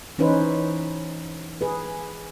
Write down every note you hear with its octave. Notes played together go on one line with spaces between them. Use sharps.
E3 C#4 D#4 B4 C5
G#4 B4